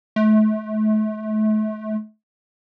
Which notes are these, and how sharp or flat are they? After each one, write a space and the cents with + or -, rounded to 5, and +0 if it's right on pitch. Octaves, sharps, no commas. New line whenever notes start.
A3 -35